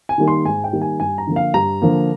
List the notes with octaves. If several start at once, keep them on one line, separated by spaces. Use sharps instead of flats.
G#5
D#3 G3 A#3 D#4
C6
G#2 G#5
G5
D#3 G3 A#3 D#4
G#5
G2 G#5
A#5
D3 F3 A#3
F5
G2 A#5
D3 F3 A#3